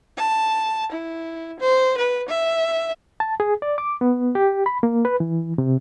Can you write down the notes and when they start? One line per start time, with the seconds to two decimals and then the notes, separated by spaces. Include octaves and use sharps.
0.17 A5
0.92 E4
1.60 C5
1.98 B4
2.29 E5
3.20 A5
3.40 G#4
3.62 D5
3.78 D6
4.01 B3
4.35 G4
4.66 B5
4.83 A#3
5.05 B4
5.20 E3
5.58 C3